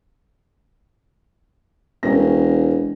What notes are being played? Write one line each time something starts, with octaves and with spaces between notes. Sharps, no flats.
E1 C#4 A#4 A#6